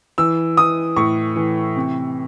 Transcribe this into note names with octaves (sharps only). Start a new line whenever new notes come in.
E3 E6
E3 D#6
A2 C#6
E3
C3